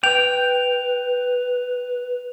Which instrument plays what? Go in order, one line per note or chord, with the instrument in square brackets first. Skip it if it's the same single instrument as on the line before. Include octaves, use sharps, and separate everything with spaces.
[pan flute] B4 [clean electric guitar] G5 [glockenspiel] F7